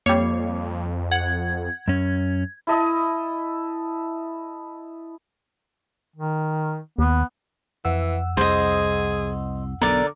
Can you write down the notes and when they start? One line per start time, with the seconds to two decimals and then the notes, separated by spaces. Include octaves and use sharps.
0.06 F2 G3 A#3 C#5
1.11 F#5 G#6
1.88 F#2 C#4
2.67 E4 A4 D#5
6.16 D#3
6.99 D#2 B3
7.85 F2 E3 F#5 E6
8.37 C2 G#4 C5 D#5
9.82 B1 D3 B3 A#4 D5